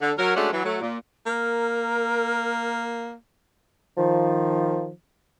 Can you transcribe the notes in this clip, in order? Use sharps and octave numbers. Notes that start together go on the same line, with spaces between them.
D3
F#3 A#4
G#3 A3 C#4 D4 F#4
E3 F#3
F#3 A3
A#2
A#3 A#4
D#3 F3